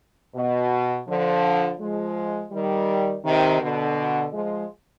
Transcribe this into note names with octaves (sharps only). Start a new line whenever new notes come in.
B2
D3 F3
F3 G#3
D#3 G3
C3 D#3
B2 D3
F3 G#3